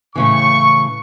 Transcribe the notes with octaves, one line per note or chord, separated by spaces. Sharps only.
A2 C#3 E3 C#6